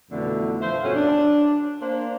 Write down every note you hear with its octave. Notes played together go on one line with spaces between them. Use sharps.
F2 B2 D3 E3 A3
F3 C5 E5
G2 B2 C#4 F#4 A4 F#5
D4
A#3 D4 C5